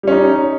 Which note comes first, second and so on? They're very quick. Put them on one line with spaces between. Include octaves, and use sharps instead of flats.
G3 C#4 D#4